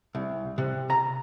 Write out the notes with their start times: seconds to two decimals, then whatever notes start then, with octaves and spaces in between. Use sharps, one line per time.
0.15 C2
0.58 C3
0.90 A#5